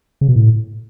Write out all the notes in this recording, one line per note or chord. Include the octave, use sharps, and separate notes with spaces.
C#3
B2
A2